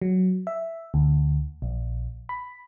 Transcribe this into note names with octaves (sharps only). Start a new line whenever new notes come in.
F#3
E5
D2
A#1
B5